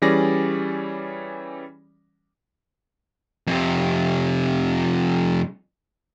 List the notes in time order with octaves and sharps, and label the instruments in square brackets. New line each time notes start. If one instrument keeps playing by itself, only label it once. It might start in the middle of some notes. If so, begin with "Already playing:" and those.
[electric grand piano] E3 G3 C#4 G#4 D5 A#6
[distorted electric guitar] F2 C3